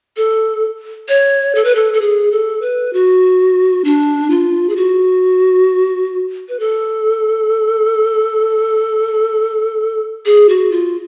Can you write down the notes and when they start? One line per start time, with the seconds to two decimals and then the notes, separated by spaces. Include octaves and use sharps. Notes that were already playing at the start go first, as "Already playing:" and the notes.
0.17 A4
1.09 C#5
1.55 A4
1.65 B4
1.75 A4
1.94 A4
2.01 G#4
2.32 A4
2.62 B4
2.93 F#4
3.84 D4
4.30 F4
4.69 G#4
4.76 F#4
6.49 B4
6.60 A4
10.26 G#4
10.49 F#4
10.72 F4